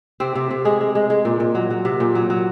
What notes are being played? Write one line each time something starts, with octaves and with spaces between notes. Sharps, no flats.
C3 C4
C3
C3
G#3 G#4
G#3
G#3
G#3
A#2
A#2
F#3
F#3
C3
A#2
F#3
F#3